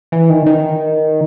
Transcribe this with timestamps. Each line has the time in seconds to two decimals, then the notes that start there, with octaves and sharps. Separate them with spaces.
0.12 E3
0.30 D#3
0.46 D#3